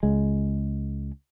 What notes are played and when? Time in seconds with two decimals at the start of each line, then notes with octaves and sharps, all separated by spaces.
0.03 C#2 G#3